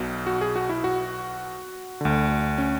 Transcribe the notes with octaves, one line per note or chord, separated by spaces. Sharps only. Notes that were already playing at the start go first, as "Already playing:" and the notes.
Already playing: B1 B2
F#4
G#4
F#4
E4
F#4
D2 D3
C#4